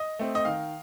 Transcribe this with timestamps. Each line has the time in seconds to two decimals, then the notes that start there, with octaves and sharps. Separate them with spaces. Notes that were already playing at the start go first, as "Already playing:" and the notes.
Already playing: D#5
0.19 A3 C4
0.35 D#5
0.45 D#3 F5